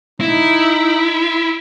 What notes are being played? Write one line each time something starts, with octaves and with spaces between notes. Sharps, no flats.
D#4 E4